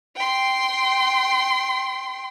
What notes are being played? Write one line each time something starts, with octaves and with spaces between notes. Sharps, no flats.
G5 C6